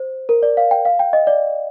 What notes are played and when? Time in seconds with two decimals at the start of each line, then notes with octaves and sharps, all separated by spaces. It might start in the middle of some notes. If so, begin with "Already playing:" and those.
Already playing: C5
0.29 A#4
0.43 D5
0.57 F5
0.71 G5
0.85 F5
0.99 G5
1.13 D#5
1.27 D5